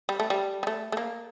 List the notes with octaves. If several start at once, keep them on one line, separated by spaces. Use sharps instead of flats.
G3
A3
G3
G3
A3
A3
A#3